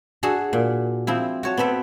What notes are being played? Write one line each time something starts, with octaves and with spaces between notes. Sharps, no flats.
D4 F#4 G#4 A4 G#5
A#2
F3 C4 E4
F#4 C#5 A5
B3 C4 A4 B4 G5